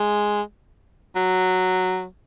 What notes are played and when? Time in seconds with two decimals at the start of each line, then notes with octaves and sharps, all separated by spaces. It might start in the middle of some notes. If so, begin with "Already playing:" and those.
Already playing: G#3
1.15 F#3